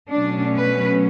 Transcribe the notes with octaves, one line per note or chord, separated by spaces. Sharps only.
B2 F#3 A3 C#4 D4
B4